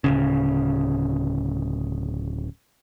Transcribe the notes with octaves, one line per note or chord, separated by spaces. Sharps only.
D1 G#1 C#3